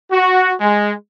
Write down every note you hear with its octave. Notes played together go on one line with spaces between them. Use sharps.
F#4
G#3